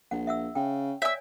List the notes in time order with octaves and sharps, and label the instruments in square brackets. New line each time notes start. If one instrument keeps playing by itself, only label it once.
[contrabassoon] A#1 [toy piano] F#5
[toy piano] E5 F#5 E6
[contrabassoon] C#3 [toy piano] G5
[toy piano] C#5 D5 G#5 [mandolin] E5 E6